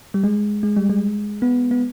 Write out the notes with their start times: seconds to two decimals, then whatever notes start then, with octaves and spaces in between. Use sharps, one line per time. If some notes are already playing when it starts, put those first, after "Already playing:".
0.14 G3
0.24 G#3
0.63 G#3
0.76 G3
0.89 G#3
1.42 B3
1.71 B3